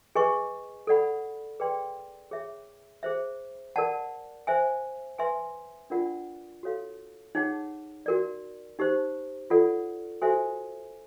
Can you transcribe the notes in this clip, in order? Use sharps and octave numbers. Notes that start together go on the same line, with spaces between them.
G#4 B4 D#5 G#5 C#6
A4 D5 F#5 B5
G#4 B4 D5 G5 C6
G#4 C#5 E5
G#4 C5 E5
A#4 D5 F#5 A5
C5 E5 G#5
B4 E5 G#5 C6
D4 F4 A#4 D5 F#5
F#4 A4 C#5 F5
D#4 G#4 C#5 F#5
F#4 A#4 D5
D#4 G4 C5
F4 A4 D5 F#5
F#4 A4 C5 E5 G#5